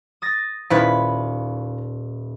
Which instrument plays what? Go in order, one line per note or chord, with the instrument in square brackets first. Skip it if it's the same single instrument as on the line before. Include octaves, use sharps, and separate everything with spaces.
[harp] D#6 A6 A#6
[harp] D#1 C#4 [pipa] F3 E4 B4